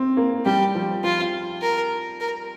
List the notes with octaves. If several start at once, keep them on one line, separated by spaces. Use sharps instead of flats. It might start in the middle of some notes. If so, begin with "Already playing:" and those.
Already playing: C4
A#3
G3 G4
F3
F3 F4
A#4
A#4